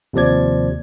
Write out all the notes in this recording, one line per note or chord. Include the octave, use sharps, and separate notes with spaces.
D#2 C3 F3 D5 G#6